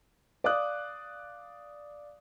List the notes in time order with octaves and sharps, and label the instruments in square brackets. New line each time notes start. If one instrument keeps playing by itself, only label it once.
[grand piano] D5 F5 D6 D#6 F#6